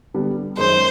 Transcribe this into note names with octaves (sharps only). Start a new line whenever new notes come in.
D3 G3 B3
F#2 D#3 G#3 C#4 C5